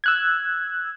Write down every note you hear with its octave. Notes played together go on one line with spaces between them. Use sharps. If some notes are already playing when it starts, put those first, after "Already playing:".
E6 F#6 G#6